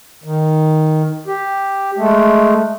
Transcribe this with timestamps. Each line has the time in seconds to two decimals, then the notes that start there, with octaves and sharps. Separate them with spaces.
0.24 D#3
1.27 G4
1.97 G#3 A3